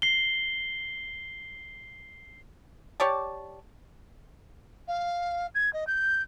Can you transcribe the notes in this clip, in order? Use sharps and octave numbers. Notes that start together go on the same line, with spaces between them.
C7 G7
G4 C#5 D5 A5
F5
G#6
D#5
G6